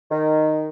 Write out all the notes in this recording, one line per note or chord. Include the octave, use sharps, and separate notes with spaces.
D#3